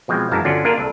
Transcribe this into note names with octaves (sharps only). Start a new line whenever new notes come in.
B2 F3 G#3 C4
F#2 E3 G#3 F5 A5 A#5
G1 D3 C#4 D4 F4 F#4
A#3 D4 F4 A#4
C2 A4